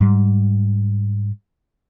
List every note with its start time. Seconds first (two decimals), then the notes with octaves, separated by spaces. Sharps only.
0.01 G#2 G3